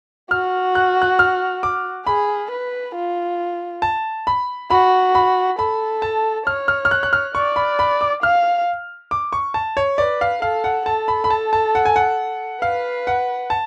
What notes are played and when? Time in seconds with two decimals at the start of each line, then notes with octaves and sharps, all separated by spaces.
0.30 F#4 F6
0.75 F#6
1.02 F#6
1.19 F6
1.63 D6
2.06 G#4 B5
2.51 B4
2.95 F4
3.82 A5
4.27 B5
4.70 F#4 B5
5.15 B5
5.59 A4 B5
6.02 A5
6.47 C#5 F6
6.68 F6
6.85 F6
6.91 F#6
7.03 F#6
7.13 F6
7.34 D5 C#6
7.56 B5
7.79 B5
8.01 D6
8.22 F5 F6
9.11 D6
9.33 C#6
9.54 A5
9.77 C#5
9.98 B4 D5
10.21 F5
10.42 A4 F5
10.64 F#5
10.86 A4 A5
11.08 B5
11.24 B5
11.30 A5
11.53 A5
11.75 F#5
11.85 G#5
11.96 F#5
12.62 B4 F5
13.07 F#5
13.50 A5